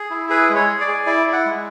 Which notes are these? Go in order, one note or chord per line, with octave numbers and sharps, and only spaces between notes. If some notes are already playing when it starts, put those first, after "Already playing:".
Already playing: G#4
E4
G#4 B4
G#3
C#5
G#4
D5
G#4
E4 D5
E4
F#5
G#3